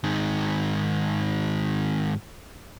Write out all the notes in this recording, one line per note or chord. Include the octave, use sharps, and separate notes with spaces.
G#2 D#3